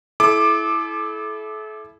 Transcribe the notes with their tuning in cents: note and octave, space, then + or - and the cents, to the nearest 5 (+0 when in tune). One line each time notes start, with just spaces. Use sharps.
E4 +0 A4 -40 D6 +15